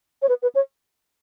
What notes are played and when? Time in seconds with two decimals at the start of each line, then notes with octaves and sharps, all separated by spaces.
0.22 C#5
0.29 B4
0.42 B4
0.55 C#5